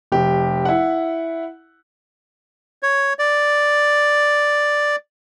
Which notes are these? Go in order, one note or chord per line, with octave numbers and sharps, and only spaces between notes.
F1 G4
E4 F#5
C#5
D5